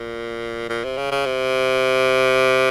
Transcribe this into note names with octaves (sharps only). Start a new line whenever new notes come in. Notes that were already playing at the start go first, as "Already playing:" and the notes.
Already playing: A#2
A#2
C3
C#3
C#3
C3